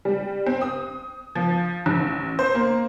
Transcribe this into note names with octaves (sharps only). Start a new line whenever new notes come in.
G3
C4
D#6
F3
A1
C5
A#3